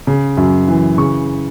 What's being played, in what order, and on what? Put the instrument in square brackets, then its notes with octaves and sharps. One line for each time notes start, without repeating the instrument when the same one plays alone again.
[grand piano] C#3
F#2
E3
C#3 C#6